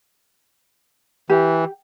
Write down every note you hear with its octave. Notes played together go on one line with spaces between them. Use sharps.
E3 G4